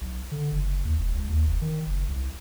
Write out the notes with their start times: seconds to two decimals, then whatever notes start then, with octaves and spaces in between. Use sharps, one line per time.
0.01 B1
0.31 D3
0.52 F#1
0.85 D#2
0.98 E1
1.14 C#2
1.29 D#2
1.47 F1
1.61 D#3
1.86 F#1
2.08 C2